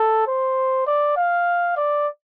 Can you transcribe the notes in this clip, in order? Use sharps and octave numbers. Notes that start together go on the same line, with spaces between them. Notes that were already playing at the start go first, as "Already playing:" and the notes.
Already playing: A4
C5
D5
F5
D5